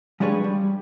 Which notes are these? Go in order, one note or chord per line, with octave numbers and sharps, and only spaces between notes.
F3 G3 G#3 D4 B4 C#5
G3